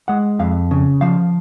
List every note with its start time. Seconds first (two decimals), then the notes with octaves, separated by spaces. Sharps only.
0.08 G#3 F#5
0.39 F2 F5
0.71 C#3
1.01 F3 F5